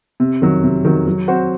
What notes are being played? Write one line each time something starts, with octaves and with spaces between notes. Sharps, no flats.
C3
D#3 F#3
C3
D#3 F#3
F#3
C4 F#4 C5